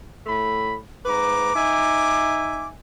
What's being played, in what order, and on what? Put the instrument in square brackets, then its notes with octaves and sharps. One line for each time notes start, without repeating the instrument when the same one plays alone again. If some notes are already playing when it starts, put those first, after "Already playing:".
[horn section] A2 A3 B5
[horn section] G#2 B4 A#5 [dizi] D6
[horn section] D#4 E5 G#5